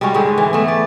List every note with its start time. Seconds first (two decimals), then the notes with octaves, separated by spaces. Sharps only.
0.01 G3 G#3 C#4 F#4
0.14 G#2 D3 G#3 G4
0.38 E3
0.53 A3 B3
0.68 D5